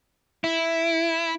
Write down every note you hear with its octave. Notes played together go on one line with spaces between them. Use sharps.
E4